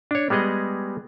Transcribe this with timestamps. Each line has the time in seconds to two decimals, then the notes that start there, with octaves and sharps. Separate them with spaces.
0.11 D4 C#5
0.30 G3 G#3 B3 G#4 D#5